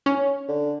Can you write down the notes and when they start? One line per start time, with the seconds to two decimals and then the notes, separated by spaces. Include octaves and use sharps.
0.06 C#4
0.48 D3